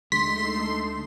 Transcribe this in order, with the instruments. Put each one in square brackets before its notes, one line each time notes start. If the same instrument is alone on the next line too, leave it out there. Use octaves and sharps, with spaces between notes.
[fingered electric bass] D2 G#3 D4 [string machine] A3 D#4 A4 [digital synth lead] C6 [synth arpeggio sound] B6